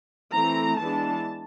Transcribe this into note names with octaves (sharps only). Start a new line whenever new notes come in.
E3 A3 C4 A#5
E3 G#3 B3 D4 A5